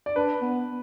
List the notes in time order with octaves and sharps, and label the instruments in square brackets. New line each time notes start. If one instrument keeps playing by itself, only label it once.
[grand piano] D5
[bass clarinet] D4 [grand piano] B4
[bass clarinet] B3